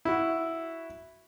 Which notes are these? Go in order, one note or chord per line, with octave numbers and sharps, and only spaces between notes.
E4 F#4